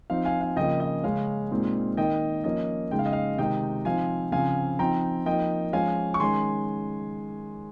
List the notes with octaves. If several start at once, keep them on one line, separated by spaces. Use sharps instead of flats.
F3 C4 D#4 F5
F5 G#5
F5
C#3 F3 A#3 D#5 G5
D#5
C#3 G#3 C#4 F5
A#2 G#3 C4 D#4
D#3 A#3 D#4 D#5 G5
F3 A#3 C#4 D#5
C#3 G#3 D#4 G5
F5
D#5
F5
C3 D#3 G#3 D#4 D#5 G5
F3 C4 D#4 F5 G#5
C#3 F3 C4 F5 G#5
F3 C4 D#4 G5 A#5
F3 A#3 D#4 D#5 G5
F3 G#3 C#4 F5 G#5
C#6
D#3 G#3 C#4 G#5 C6